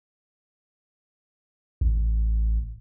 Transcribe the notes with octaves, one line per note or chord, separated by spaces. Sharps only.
A1